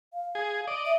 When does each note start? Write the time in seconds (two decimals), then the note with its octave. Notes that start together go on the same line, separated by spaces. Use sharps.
0.13 F5
0.35 G#4
0.67 D5 D#5
0.86 E5